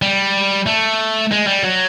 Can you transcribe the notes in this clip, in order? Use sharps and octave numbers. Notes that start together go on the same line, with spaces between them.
G3
A3
G#3
G3
F#3